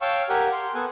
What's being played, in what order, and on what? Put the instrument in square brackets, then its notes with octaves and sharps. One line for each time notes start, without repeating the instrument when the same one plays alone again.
[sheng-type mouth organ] C#5 F5 G5 A5 C#6 E6
G4 A#4 F#5 G#5
C6
B3 A4 F#5 G#5